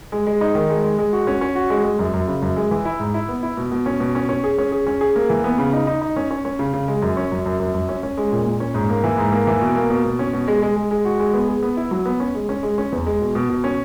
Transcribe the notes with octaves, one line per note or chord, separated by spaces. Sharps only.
G#3
G#3
D#4
D#3
G#3
G#3
G#3
F#4
C#4
C#4
F#4
G#3
G#3
F#2
F#2
C#3
F#2
G#3
E3
E4
G#2
E4
B3
E4
B2
B2
C#4
B2
C#4
C#4
G#4
C#4
G#4
C#4
G#4
A#3
E3
B3
C#3
D#4
D#4
D#4
C#4
C#4
C#4
C#3
C#3
G#3
F#2
C#4
F#2
F#2
F#2
F#2
C#4
C#4
G#3
A#2
A#2
C#4
G#2
A#3
E3
G#2
A#3
E3
B2
A#3
B2
B2
C#4
B2
G#3
G#3
G#3
G#3
F#4
G#3
B3
G#4
B3
E4
F#3
B3
C#4
G#3
C#4
G#3
C#4
E2
G#3
B2
B2
B2
C#4